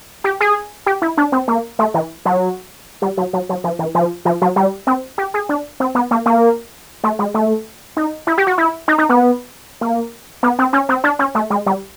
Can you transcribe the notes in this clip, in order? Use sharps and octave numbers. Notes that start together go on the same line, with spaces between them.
G4
G#4
G4
E4
D4
C4
A#3
A3
E3
F#3
G3
F#3
F#3
F#3
F3
E3
F3
F3
F#3
G3
C4
G4
G#4
D4
C4
B3
A#3
A#3
A3
G#3
A3
D#4
E4
G4
F#4
E4
D#4
D#4
B3
A#3
B3
C4
C#4
C4
D4
C#4
A3
G#3
G3